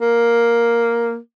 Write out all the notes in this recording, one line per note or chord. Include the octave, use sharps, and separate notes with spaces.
A#3